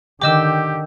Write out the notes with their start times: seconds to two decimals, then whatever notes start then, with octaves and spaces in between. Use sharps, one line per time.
0.22 D3 D#3 G4 D#5 G5 D6 E6